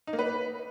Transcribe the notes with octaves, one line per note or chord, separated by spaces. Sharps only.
D#4
A#3
B4